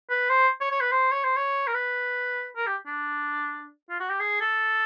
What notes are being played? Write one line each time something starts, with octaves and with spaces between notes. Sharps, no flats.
B4
C5
C#5
C#5
B4
C5
C#5
C5
C#5
A#4
B4
A#4
G4
D4
F4
F#4
G4
G#4
A4